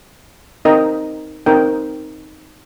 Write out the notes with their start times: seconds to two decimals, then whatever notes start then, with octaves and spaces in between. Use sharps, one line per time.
0.65 C4 D#4 A#4 D#5 G5
1.46 C4 D#4 A#4 D#5 G5